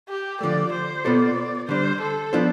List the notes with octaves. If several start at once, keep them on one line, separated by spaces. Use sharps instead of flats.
G4
D3 F3 A3 D5
C5
B2 B3 F4 A4 C5 D5
D3 G3 D4 C5
A4
F3 B3 D4 F4 C5